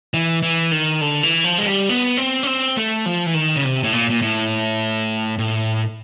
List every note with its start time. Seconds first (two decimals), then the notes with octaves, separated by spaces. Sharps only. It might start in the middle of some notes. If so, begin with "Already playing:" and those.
0.14 E3
0.43 E3
0.71 D#3
1.01 D3
1.23 E3
1.44 F3
1.58 G#3
1.66 G3
1.89 B3
2.17 C4
2.43 C#4
2.47 C4
2.77 A3
3.06 F3
3.26 E3
3.35 D#3
3.56 C#3
3.65 C3
3.83 A2
3.93 A#2
4.10 A#2
4.22 A2
5.39 A2